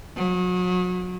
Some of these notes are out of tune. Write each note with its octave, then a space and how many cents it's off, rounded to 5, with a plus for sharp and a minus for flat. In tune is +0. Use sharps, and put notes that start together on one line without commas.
F#3 -35